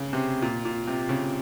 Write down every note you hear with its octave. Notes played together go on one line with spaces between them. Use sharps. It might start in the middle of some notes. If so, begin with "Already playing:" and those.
Already playing: C#3
C3
A#2
A#2
C3
C#3